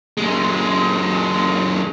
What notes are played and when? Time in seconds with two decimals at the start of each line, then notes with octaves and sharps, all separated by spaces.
0.17 F#2 G#3